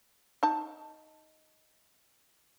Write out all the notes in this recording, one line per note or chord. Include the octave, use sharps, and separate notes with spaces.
D#4 A5